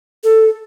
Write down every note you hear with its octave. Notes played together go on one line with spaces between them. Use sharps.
A4